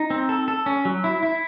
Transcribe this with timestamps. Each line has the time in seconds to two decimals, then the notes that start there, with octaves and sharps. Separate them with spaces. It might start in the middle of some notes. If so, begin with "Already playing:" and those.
Already playing: D#4
0.10 C4
0.29 A4
0.48 A4
0.66 C#4
0.85 F#3
1.04 E4
1.23 E4